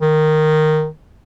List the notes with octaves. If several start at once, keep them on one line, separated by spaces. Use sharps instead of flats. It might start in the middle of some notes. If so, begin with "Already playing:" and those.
D#3